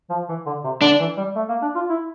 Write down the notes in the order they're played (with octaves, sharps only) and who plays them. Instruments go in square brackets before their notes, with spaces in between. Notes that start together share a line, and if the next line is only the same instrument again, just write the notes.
[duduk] F3
E3
D3
C3
[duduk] D3 [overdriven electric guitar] D4
[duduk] E3
G3
A3
A#3
D4
F4
E4